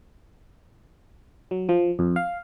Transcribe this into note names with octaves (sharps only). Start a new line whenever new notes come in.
F#3
F3
F2
F5